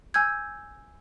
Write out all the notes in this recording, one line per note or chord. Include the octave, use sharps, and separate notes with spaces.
G#5 E6 G6 G#6